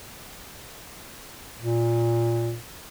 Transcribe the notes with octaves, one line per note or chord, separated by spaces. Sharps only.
A#2